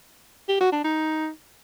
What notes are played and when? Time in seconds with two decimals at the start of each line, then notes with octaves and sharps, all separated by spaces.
0.49 G4
0.61 F#4
0.72 D4
0.84 D#4